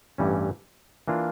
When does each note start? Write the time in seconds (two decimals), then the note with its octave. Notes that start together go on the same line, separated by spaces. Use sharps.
0.18 A1 G2 E3 G3 C#4
1.08 E3 A#3 D4 F4